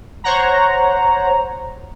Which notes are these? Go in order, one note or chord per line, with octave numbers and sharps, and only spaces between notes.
C5 C#5 F#5 A#5